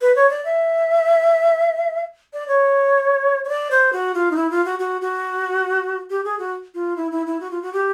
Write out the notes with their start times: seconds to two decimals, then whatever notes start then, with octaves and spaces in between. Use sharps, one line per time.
0.01 B4
0.16 C#5
0.30 D5
0.45 E5
2.33 D5
2.48 C#5
3.45 C#5
3.49 D5
3.71 C5
3.93 F#4
4.14 F4
4.31 D#4
4.36 E4
4.51 F4
4.65 F#4
4.79 F#4
5.01 F#4
6.10 G4
6.24 G#4
6.39 F#4
6.74 F4
6.97 E4
7.12 E4
7.26 E4
7.40 F#4
7.51 F4
7.62 F#4
7.73 G4